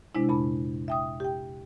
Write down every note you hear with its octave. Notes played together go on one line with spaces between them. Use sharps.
C3 G#3 D4 E4
F2 A#2 B5
E5 G5 D#6
G4 G5